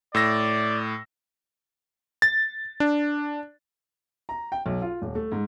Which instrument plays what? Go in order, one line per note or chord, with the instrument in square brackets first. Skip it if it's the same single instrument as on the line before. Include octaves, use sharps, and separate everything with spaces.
[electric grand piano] A2 E6 A#6 [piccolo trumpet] D5
[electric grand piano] A6
D4
[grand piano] A#5
G5
B1
F4
D#1
A3
G#2